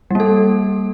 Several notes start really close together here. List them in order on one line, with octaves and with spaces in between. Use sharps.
G3 A#3 A4